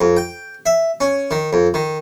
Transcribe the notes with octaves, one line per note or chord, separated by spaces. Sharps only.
F2
G5
E5
C#4
D#3
F2
D#3